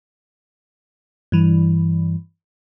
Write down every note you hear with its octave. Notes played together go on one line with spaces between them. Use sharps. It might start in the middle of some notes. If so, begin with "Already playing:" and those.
G2 E3